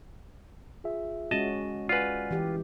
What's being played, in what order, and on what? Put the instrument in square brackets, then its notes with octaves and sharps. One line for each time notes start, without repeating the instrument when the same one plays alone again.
[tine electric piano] F4 G#4 E5
[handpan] G#3 C#4 F#4 [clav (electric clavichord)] D#5 A5
[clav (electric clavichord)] F4 B4 [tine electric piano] D5 F#5 G#5
[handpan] E3 G4